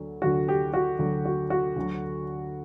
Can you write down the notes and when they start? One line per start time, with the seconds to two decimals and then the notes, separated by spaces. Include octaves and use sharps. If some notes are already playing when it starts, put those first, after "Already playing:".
Already playing: D2 D3 F#3
0.22 D2 D3 F#3 F#4
0.48 G4
0.74 F#4
0.99 D2 D3 F#3
1.25 F#4
1.50 F#4
1.76 D2 D3 F#3